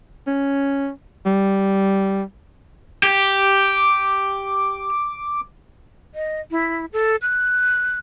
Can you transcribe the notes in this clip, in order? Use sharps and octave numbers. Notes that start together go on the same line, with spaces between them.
C#4
G3
G4 D6
D#5
E4
A4
F#6